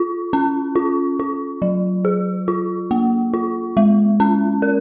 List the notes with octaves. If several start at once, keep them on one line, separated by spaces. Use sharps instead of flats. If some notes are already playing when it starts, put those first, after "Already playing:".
Already playing: F4
C#4
F4
F4
F#3
G#4
F4
A#3
F4
G#3
C#4
A#4